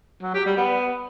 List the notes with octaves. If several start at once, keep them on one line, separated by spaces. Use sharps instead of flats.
F#3
G4
G3
B3